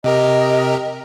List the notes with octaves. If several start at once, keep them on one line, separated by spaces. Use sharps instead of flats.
C3 G4 A#4 D#5